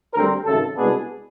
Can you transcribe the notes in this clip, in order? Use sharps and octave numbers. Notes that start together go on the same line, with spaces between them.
D2 D3 G3 C4 A#4
G#1 F#2 C#3 A4
C2 B2 G#3 B3 D4 G#4